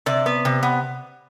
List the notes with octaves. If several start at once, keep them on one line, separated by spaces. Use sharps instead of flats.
C3 D5
B3
C3
B3